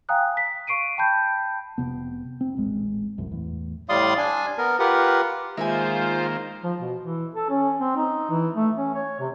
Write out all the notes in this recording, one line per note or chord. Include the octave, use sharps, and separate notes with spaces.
F5 G5 G#5 A#5 D#6 F#6
B6
F5 C#6 C7 D7 D#7
G5 A5 B5 G6
F1 F#2 C3 B3
C4
D#1 A1 G#3
F1 C2 F#2
E2 A2
A2 G3 D5 F5 C6 D#6
D4 G#5
B3 A#4
F4 G4 A#4 B4 F#5
D#3 G#3 A#3 F4 C5 E5 F5 G#5
F3
B2
E3
A4
C#4
C4
D#4
E3
A3
C#4
C#5
C3